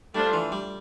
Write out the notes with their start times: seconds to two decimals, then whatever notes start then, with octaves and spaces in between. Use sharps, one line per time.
0.15 G3 A3 D4 F4 C5
0.33 E3
0.52 G3